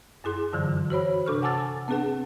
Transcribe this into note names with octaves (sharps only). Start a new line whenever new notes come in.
F#2 E4 G#4 C6
G2 D3 E3 F#3
F#4 C5 C#5 B5
C3 D4 A4 C#6 F6
F#5 G#5 A5 D6 E6 A6
B3 C4 D4 G#4 B4 F#5